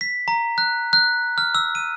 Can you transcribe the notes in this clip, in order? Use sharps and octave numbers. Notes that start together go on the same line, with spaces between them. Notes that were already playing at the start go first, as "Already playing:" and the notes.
B6
A#5
F#6
F#6
F6
E6
D#7